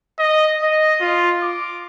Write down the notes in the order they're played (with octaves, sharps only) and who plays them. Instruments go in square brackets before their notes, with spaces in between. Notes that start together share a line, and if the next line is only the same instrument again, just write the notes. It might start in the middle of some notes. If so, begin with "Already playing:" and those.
[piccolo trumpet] D#5
D#5
F4
D6